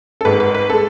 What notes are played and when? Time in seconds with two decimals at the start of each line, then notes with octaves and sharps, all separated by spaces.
0.21 A4
0.25 G#1 G#2 G#3 B4
0.40 B4
0.54 B4
0.69 G#3 A4